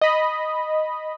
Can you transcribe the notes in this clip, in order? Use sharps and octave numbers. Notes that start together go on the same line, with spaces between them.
D#5 B5